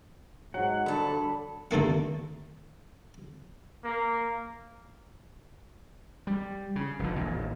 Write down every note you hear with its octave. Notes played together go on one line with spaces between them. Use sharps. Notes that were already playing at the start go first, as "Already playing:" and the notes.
G#2 F#3 F#5
G2 D3 A4 B5
D#2 D3 A3 A#3 F#5
A#3
G3
C#3
F1 D3
A1 D#2 A#2